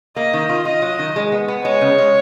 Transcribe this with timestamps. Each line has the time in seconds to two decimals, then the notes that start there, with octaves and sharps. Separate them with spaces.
0.16 A#3 D#5
0.33 D#3
0.49 F4
0.65 F4 D#5
0.82 F#3
0.99 D#3
1.16 G#3
1.32 B3
1.48 B3
1.64 G#3 C#5
1.81 C#3
1.98 G#3